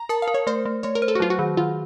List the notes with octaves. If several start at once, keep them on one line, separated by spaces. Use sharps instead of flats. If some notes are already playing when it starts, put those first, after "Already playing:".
Already playing: A#5
A#4 A5
F5
A#4
C#5
A3 C5
A3
A3 C#5
A#4
C5
A4
F#4
F#3 F4
F#4
D#3
D#3 F4